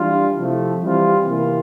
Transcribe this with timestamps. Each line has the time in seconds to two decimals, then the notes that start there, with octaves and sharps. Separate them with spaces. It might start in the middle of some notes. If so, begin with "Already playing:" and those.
Already playing: E3 G3 D4 F4
0.37 C3 F3 A3 E4
0.82 E3 G3 C4 F4
1.27 C3 E3 A#3 F4